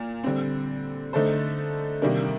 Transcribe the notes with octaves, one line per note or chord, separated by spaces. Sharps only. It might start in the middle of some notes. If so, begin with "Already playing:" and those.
Already playing: A#2 F4
D3 G3 C4
D3 A3 D#4 A4 C5
C3 D#3 G3 A#3 D4